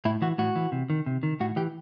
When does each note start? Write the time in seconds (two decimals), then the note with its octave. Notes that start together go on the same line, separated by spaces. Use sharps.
0.05 A2 E4
0.22 E3 F#4
0.38 A2 F#4
0.56 E3
0.72 C3
0.90 D#3
1.06 C3
1.23 D#3
1.40 A2 F#4
1.56 E3 G4